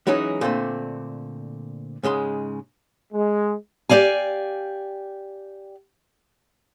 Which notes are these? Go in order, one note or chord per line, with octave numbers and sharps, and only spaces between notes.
E3 F#3 G#3 C#4 D#4
A#2 D3 A3 C4
G#2 C#3 G#3 C6
G#3
G4 A#4 D5 F5 G#5